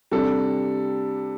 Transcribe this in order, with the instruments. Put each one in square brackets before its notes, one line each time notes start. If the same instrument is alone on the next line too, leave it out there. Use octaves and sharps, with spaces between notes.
[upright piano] C3 G3 D4 A4